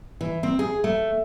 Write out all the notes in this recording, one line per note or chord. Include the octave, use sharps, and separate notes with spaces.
E3
C4
G#4
A3